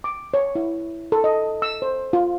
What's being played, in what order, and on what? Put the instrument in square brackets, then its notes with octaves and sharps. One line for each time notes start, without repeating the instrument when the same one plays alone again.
[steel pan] D6
C#5
E4
A4
D#5
E6
C5
F4